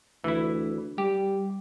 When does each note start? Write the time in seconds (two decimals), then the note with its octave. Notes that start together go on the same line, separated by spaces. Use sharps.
0.24 D2 E3 E4
0.98 G3 G4